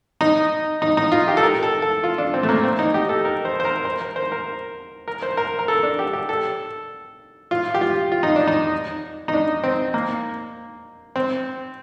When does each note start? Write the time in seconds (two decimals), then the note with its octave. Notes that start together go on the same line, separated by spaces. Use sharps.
0.21 D#4
0.82 D#4
0.97 D#4
1.12 F4
1.28 G4
1.37 A4
1.43 A#4
1.63 A4
1.82 A4
2.04 F4
2.18 D4
2.34 C4
2.43 A3
2.49 A#3
2.64 C4
2.79 D#4
2.94 G4
3.09 A4
3.25 A#4
3.45 C5
3.60 C5
3.65 A#4
3.85 C5
4.01 A#4
4.16 C5
4.32 A#4
5.08 A#4
5.22 C5
5.37 A#4
5.59 A#4
5.68 A4
5.83 D4
5.99 G4
6.13 G4
6.29 A4
7.51 F4
7.74 G4
7.81 F4
8.12 F4
8.23 D#4
8.36 D4
8.47 D#4
9.28 D#4
9.33 D4
9.64 C4
9.94 A#3
11.16 C4